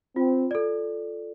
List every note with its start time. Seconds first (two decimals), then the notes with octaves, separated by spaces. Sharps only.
0.16 C4 F4
0.51 A4 D5